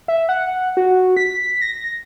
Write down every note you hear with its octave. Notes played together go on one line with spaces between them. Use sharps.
E5
F#5
F#4
B6
A#6